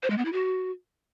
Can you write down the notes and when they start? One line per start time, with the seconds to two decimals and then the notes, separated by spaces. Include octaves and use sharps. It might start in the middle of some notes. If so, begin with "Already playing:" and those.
0.03 C5
0.10 G#3
0.18 B3
0.25 E4
0.33 F#4